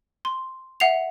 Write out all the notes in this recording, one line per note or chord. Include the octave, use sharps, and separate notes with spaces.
C6
E5 F#5 C7 F7